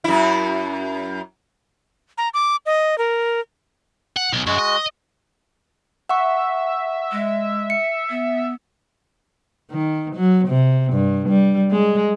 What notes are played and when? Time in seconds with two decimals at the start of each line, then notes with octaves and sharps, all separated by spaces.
0.04 F#2 E4
2.18 A#5
2.34 D6
2.66 D#5
2.98 A#4
4.16 F#5
4.33 B1
4.47 F#2 G#3 F#4
4.58 D#5
6.09 E5 F#5 C#6
7.12 G#3
7.70 C#7
8.10 B3
9.71 D#3
10.16 F#3
10.48 C3
10.93 G2
11.29 G3
11.71 G#3